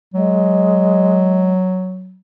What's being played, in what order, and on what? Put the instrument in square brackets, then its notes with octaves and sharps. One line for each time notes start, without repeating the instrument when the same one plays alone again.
[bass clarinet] F#3 [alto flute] G#3